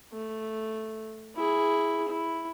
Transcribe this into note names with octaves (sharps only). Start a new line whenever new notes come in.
A3
E4 G#4
E4